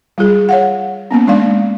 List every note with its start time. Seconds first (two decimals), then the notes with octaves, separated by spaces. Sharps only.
0.18 G3 F4 G#4
0.49 C#5 F5 F#5
1.11 A#3 B3 C#4
1.27 G#3 D4 D5 F5